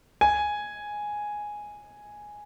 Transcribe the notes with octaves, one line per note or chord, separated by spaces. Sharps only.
G#5